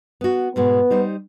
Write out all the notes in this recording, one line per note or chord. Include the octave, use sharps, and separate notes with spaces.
B3 F#4
G#2 B2 G#3 B3
G3 D#4 C5